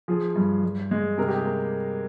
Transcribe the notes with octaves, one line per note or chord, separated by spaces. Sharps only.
F3 G#4
G2
G2
G#3
C3 A#4
G4
G#4
A#3